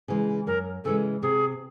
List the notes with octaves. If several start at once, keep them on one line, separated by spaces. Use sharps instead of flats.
C#3 E3 G#3
F#2 A#4
C#3 E3 G#3 A4
C3 G#4